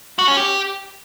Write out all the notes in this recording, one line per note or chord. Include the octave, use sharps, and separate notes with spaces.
F#4
C#4
G4